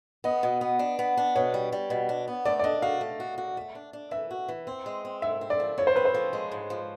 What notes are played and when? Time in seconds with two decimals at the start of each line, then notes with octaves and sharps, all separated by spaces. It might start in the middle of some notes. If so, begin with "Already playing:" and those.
0.24 B3 D#5
0.43 B2
0.61 B3
0.79 D4
0.99 B3
1.17 D4
1.36 B2 C#5
1.54 G3
1.72 G3
1.90 B2
2.09 D4
2.28 B3
2.45 A3 D5
2.59 D5
2.64 D4 D#5
2.82 F#4 F5
3.01 A3
3.20 F#4
3.38 F#4
3.57 A3
3.75 D4
3.93 D4
4.11 E3 E5
4.31 F#4
4.49 E3
4.67 C4
4.86 G#3
5.05 C4
5.22 G#2 E5
5.41 C4
5.50 D5
5.60 F3
5.78 F3 C#5
5.87 C5
5.96 C4 B4
6.05 C5
6.14 F3
6.33 G#3
6.51 G#2
6.70 F3